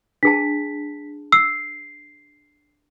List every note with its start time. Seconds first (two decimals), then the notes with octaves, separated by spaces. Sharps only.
0.23 D4 G#4 A5 B6
1.32 E6 C7